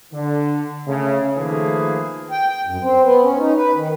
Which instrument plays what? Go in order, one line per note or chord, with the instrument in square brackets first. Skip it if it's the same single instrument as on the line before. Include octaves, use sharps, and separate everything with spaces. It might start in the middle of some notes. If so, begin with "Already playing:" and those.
[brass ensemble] D3
C#3 A3
D#3 F3 A3 A#3 G#4 B4
[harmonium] G5
G5
F#2
C4
B3
C#4
D#4
B4
D#3